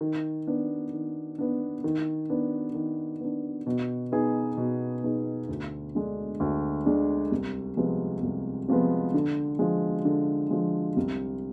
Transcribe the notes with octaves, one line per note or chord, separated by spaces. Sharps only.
D#3
B3 D4
D#3
B3 D4
D#3
B3 D4
D#3
B3 D4
B2
B3 D#4 G#4
B2
B3 D#4 G#4
D2
D3 G#3 D4
D2
D3 G#3 D4
C2
C3 F3 G#3 B3
C2
C3 F3 G#3 B3
D3
F3 G#3
D3
F3 G#3
C2